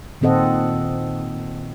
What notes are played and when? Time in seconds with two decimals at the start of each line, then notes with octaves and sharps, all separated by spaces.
0.21 A#2 D#3 C4 A4 D#5 F#5